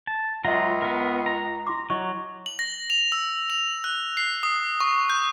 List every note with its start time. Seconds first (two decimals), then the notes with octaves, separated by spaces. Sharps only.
0.07 A5
0.45 C#2 F#3 F4 D#5 E5 F#5 A#5
0.82 B3 A#4
1.26 A#5
1.67 E4 C6 D6
1.90 F#3 E4 D#5 C#6
2.46 F#7
2.59 A#6
2.90 F7
3.12 E6
3.50 F7
3.84 F#6
4.17 C7
4.43 D#6
4.80 C#6
5.10 G6